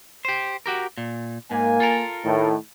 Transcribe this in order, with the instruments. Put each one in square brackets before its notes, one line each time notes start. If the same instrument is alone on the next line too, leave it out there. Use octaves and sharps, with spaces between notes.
[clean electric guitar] G4 C5
F#4 G4 A#4
A#2
[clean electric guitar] G#2 [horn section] A#3 G#5
[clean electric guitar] F4 A4 A#4
[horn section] A2 D#3